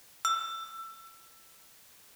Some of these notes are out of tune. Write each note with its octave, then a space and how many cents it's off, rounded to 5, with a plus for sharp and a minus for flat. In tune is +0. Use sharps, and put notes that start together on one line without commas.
E6 +20